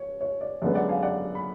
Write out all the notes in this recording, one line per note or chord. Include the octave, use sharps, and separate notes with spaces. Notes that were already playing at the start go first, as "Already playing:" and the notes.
Already playing: C#5
C#5
D5
F#2 D3 G#3 B3 D5
D5 F#5
F5 G#5
D5 F#5
B5